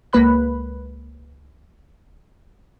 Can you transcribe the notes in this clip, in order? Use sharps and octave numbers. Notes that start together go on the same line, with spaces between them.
C#2 G#3 A#3 B4 B5 F#6